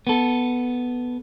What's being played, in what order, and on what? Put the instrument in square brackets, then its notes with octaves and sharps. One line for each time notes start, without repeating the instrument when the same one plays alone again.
[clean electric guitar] B3 A4